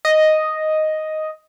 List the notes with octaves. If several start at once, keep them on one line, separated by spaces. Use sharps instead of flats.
D#5